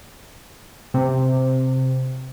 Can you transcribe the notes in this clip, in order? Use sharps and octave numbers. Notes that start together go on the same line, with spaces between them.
C3